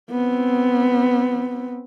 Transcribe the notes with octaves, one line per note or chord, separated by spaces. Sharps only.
B3 C4